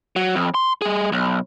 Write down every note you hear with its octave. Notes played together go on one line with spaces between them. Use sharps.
F#3
F2
C6
G3 G#4
B1